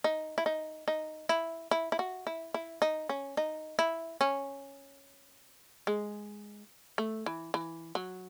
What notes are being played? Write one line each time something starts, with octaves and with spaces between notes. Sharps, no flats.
D#4
E4
D#4
D#4
E4
E4
E4
F#4
E4
E4
D#4
C#4
D#4
E4
C#4
G#3
A3
E3
E3
F#3